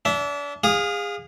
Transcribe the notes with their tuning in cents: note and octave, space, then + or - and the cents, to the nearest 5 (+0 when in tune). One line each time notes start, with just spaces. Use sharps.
D4 -35 E5 +0
G#4 -25 F5 +20 D#6 +0